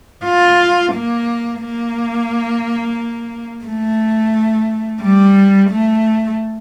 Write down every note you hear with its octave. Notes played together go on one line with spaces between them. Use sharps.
F4
A#3
A#3
A3
G3
A3